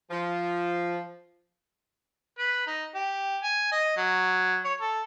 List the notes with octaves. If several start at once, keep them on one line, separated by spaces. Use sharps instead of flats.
F3
B4
D#4
G4
G#5
D#5
F#3
C#5
A4